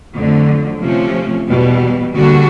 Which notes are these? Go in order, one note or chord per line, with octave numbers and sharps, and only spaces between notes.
F2 D3 F#3 A3
C3 F3 A3 C#4
E2 B2 G3
D3 G3 A#3 D4 F#4